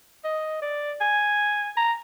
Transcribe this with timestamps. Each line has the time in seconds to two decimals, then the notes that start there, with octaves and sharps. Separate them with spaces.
0.24 D#5
0.62 D5
1.01 G#5
1.77 A#5